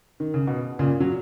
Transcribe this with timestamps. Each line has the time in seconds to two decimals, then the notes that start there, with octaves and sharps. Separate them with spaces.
0.20 D#3
0.34 C#3
0.47 B2
0.79 A#2 C#3
1.00 F#3